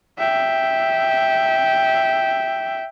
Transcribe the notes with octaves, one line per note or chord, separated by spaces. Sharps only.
E5 G5